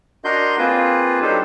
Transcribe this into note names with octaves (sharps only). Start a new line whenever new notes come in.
D4 F#4 A#4 D#5 C6 G6
A#3 C4 F4 G#4 B4 C5
F#3 D4 D#4 G4 A4 C5